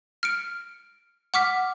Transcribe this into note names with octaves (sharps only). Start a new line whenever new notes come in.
F6 C#7 D7
F#5 C#6 D6 F6 B6